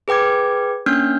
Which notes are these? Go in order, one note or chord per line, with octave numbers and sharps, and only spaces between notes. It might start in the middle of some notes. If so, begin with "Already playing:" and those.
G#4 B4 G5 D6 G#6
A#3 C#4 D4 F6 G6